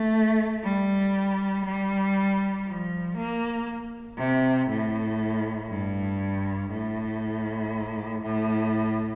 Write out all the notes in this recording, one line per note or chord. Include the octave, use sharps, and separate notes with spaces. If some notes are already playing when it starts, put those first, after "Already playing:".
Already playing: A3
G3
G3
F3
A#3
C3
A2
G2
A2
A2